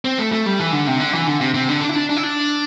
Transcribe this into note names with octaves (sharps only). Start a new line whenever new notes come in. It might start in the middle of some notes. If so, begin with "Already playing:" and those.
C4
A3
A3
G3
E3
D3
C3
D3
E3
D3
C3
C3
D3
D4
E4
D4
D4
E4
D4